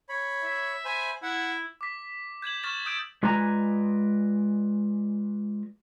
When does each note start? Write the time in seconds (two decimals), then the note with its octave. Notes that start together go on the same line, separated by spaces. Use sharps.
0.09 C#5 B5
0.44 E5
0.85 C5 G#5 B5
1.23 E4 F#5
1.81 D6 B6
2.42 G6 G#6 E7 F#7
2.63 C#6 F6 G6 A6 E7 F#7
2.86 D#6 E6 G6 D7
3.23 G#3 F4 B4 D5 G#5 A#5